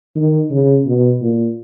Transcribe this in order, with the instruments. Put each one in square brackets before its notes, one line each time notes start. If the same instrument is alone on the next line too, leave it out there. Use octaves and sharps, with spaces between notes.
[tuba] D#3
C#3
B2
A#2